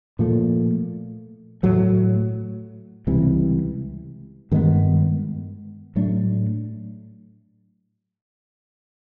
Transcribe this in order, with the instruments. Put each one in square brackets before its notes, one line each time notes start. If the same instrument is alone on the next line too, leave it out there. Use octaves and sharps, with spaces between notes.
[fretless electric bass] A#2 F3 A3
A2 F#3 A3
C#2 C3 E3 G3
G2 D#3 G#3 B3
A2 F#3 A3 D4